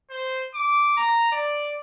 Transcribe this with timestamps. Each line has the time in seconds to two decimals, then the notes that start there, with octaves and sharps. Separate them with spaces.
0.10 C5
0.54 D6
0.97 A#5
1.32 D5